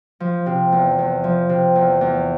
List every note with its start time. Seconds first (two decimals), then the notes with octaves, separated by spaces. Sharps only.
0.20 F3
0.46 C3
0.72 E2
0.98 E2
1.24 F3
1.49 C3
1.76 E2
2.01 E2